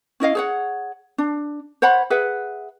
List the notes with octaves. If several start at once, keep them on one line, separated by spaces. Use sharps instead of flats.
C#4 E4 D#5 F5
G#4 C#5 F#5
D4
C5 C#5 F#5 B5
G#4 B4 E5 F#5